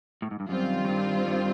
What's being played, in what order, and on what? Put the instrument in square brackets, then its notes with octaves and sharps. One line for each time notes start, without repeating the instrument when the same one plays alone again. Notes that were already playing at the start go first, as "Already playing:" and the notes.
[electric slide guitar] A2
G#2
G2
[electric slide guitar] F#2 [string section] D#3 G3 C4 F4
[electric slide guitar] F#2
G2
G2